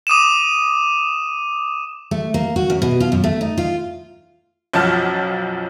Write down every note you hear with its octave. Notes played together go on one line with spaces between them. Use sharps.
D6 D#6 D#7 E7
A3
A#3
F#4
F#2
B2
F4
F#2
A3
D#4
F4
B1 F#2 F3 F#4 A5 F6